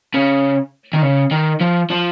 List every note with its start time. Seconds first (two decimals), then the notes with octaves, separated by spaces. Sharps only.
0.14 C#3
0.93 D#3
1.02 C#3
1.31 D#3
1.61 F3
1.90 F3